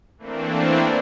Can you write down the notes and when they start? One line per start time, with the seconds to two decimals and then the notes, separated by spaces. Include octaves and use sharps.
0.18 E3 A3 A#3 C4 D4